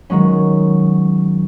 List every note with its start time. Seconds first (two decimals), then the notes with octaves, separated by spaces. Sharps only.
0.10 D#3 F#3 G#3 C#4